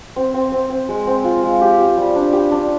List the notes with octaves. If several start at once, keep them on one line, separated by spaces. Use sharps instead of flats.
C4
C4
C4
C4
G#3
C4
F4
G#3
G4
G4
G3
D4
G4
D4